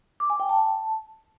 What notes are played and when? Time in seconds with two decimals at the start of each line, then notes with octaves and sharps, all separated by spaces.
0.20 D6
0.30 G#5
0.40 G5
0.49 A5